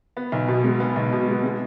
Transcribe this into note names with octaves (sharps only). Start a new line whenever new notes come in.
B3
B1
B2
G#3
B3
B1
B2
G#3
G#3